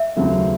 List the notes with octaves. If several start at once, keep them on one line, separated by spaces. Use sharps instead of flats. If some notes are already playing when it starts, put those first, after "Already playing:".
Already playing: E5
D#2 C#3 F#3 A3 C4